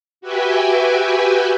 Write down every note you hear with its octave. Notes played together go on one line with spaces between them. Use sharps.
F#4 G4 B4 E5 G5 G#5